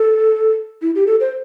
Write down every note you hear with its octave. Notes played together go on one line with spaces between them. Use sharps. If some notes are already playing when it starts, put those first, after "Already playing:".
Already playing: A4
E4
G4
A4
C5